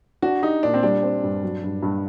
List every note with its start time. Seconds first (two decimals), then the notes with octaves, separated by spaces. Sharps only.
0.22 D4 F#4
0.43 D#4 G4
0.63 A#2 D4
0.74 C4
0.83 G3 D4
1.03 C4
1.23 G2
1.43 F#3
1.63 G2
1.83 G2